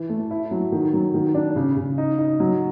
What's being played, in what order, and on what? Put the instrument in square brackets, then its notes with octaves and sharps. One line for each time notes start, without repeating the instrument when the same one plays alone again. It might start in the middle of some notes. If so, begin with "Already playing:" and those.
Already playing: [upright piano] E3
A3
E4
F#3
D#3
F#3
D#3
D4
C#3
C#3
D#4
D#4
F#3